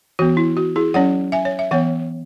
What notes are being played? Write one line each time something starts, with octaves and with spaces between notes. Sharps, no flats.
E3 B3 F#4
E4
F#4
E4 G#4
F#3 C#4 C#5 F#5
E5 G#5
C#5
E5
E3 B3 C#5 F#5